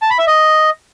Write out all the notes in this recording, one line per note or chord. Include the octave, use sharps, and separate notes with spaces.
A5
B5
E5
D#5